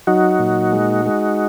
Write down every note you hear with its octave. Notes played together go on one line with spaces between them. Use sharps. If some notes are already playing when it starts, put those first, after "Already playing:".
F#3 D#4 F#4
A#2
G#3
G#3